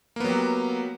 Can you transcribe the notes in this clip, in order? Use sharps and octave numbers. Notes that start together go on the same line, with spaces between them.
F#3 A#3 B3 G4